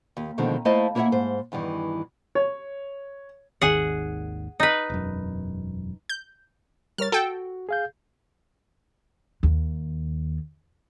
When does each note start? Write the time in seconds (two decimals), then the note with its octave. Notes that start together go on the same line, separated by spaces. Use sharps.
0.17 D#2
0.38 B2 D3 D#3 F3 G#3 C4
0.65 A3 E4 C5 D#5 F5 A5
0.95 A#3 E4 B4 C#5 E5 F#5
1.12 G#2 C5
1.52 E2 G2 D#3 E3
2.35 C#5
3.61 G#1 D#2 D#3 G#4 F#5
4.60 D#4 B4
4.90 E1 F#2
6.09 G6
6.98 G3 A#4 C#5 F6 A6
7.12 F#4 A4 G5
7.69 G#4 F5 G6
9.43 D#2